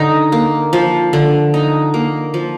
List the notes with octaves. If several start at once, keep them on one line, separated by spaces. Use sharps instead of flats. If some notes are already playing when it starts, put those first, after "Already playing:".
Already playing: D3 D#4
A#3
F3
D3
D#4
A#3
F3